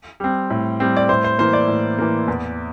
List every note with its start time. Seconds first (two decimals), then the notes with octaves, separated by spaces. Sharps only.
0.20 G3 C4
0.50 A2
0.80 G3 C4
0.97 D5
1.09 A2 C5
1.24 C5
1.39 E3 A#3 C5
1.53 D5
1.68 A2
1.98 E3 A#3
2.28 E2